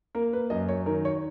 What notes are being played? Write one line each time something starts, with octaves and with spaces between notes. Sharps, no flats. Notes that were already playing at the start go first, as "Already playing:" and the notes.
A#3 A#4
B4
F#2 D#5
C#5
D#3 A#4
C#5